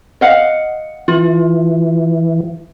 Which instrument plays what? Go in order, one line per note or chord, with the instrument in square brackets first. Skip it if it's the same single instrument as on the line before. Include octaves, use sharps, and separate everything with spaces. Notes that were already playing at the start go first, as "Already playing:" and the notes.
[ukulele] D#5 F5 F#5
[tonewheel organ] E3 [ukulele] F4